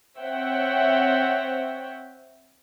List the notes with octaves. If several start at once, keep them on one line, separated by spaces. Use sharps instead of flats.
C4 C#5 E5 F#5 G5